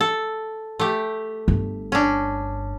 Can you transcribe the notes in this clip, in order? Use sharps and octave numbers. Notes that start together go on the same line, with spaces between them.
A4
A3 G4
G1
C#4 D4